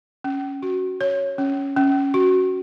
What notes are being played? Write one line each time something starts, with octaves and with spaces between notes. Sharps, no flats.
C#4
F#4
C#5
C#4
C#4
F#4